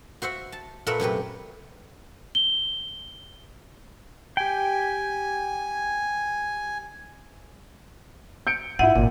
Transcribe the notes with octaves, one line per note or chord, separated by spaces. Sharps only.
F#4 C5 E5 F#5
A5
A#2 A3 A#4 B4 E5 F#5
F#2 C3 G4 B4
G7
G4 G5 G#5
G6 C#7 D7
G#2 E4 F4 E5 F#5 D#7
G#1 A#2